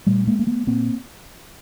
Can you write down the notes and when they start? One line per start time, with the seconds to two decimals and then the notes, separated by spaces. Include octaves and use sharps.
0.07 A#2 G3 A3
0.27 G#3 A#3
0.39 A#3
0.47 A3 B3
0.67 A#2 A#3 C4